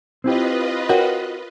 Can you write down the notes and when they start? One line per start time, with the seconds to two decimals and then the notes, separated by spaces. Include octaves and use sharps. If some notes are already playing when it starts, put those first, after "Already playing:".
0.24 C4 E4 F4 G4 B4 D#5
0.89 F#4 A#4 C#5 G5